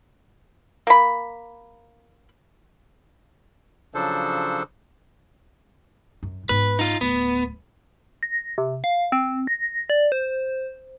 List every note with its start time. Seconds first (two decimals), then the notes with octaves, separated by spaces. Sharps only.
0.87 A#3 B5
3.94 C#3 F3 F#3 D4 A4 C5
6.23 F#2
6.49 G#2 B3 B4
6.79 D#4 F4
7.01 D1 B3
8.23 A#6
8.58 C3
8.84 F5
9.12 C4
9.47 A#6
9.90 D5
10.12 C5